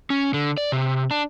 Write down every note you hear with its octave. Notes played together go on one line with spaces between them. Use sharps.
C#4
D3
D5
C3
D4